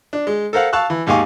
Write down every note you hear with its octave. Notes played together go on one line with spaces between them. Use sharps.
D4
G#3
A4 A#4 C5 F5 F#5
F5 A5 C#6 E6 F#6
E3
D#2 G#2 G4 F5 G#5 C#6